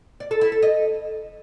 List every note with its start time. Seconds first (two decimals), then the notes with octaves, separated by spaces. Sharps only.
0.20 D5
0.31 A4
0.41 E4
0.52 A4
0.63 D#5